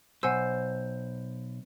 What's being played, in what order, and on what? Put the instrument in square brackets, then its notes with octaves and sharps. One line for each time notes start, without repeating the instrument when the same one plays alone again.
[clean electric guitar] B1 [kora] C5 [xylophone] F#5 G#5 E6